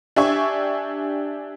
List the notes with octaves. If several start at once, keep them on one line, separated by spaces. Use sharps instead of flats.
D4 G4 E5 G#5 C#6